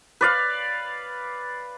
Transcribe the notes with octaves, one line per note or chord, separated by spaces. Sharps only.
B4 D5 F5